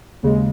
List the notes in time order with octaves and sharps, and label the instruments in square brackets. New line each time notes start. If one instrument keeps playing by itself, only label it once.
[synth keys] D#2 C#3 G#3